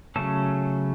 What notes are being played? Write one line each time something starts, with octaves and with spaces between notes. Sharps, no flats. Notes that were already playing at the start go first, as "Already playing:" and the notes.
C#3 F#3 A3 C#4 A4